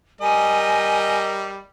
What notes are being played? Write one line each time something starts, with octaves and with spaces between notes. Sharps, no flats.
G3 A#4 D#5 G#5